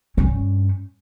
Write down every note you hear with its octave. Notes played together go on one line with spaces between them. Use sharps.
G2 C#4